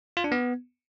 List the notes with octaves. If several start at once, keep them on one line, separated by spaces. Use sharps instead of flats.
F4
D4
B3